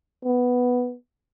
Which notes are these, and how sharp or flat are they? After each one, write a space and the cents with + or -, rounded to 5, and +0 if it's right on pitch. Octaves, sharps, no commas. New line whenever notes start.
B3 +0